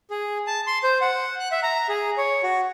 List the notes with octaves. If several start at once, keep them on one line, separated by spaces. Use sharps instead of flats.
G#4
A5
C6
C5
F#5
F#6
E5
A#5
G#4
C#5
F#4